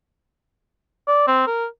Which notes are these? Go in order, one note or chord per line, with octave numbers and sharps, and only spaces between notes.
D5
C4
A#4